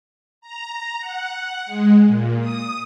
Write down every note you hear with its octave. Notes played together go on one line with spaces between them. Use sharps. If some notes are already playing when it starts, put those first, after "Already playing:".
A#5
F#5
G#3
A#2
D#6